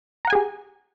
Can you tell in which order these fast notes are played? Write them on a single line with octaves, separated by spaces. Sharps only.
A#5 F#5 G#5 G#4 G4